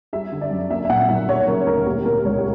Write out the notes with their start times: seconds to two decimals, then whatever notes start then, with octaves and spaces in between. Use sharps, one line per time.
0.13 G3 E5
0.32 D3
0.41 D5
0.51 F#2
0.70 A#3 E5
0.85 E5
0.89 A#2 F#5
1.09 B1 E5
1.29 G3 C#5
1.48 C#3 A#4
1.67 D2 A#4
1.86 A#3 G4
2.05 B2 A#4
2.25 C#2 C#5
2.38 G4